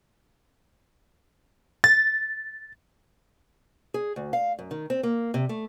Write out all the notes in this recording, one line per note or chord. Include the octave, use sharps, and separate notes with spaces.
A6
G#4
D2
F5
F#2
D#3
C4
A#3
C3
A3